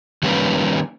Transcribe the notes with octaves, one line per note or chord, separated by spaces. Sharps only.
D#3 G3 A#3 C#4 B4